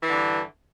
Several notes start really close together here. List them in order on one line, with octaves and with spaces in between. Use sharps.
E3 D3 G2